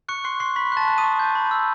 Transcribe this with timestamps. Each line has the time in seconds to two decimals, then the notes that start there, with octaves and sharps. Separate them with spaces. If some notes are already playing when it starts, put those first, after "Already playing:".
0.09 C#6 F#6 C#7
0.24 C6 F#6 C7
0.40 C6 C#6 C7
0.56 B5 C#6 B6
0.72 A5 F#6 A6
0.87 F#6
0.98 D#6 D#7
1.04 C#6
1.19 G6
1.35 B5
1.51 E6